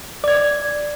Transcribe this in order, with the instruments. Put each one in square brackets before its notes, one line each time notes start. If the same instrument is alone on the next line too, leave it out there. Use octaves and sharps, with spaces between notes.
[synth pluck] D5 G#6